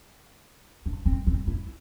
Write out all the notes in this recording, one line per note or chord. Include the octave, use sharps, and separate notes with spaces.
D4
C4
C4
E4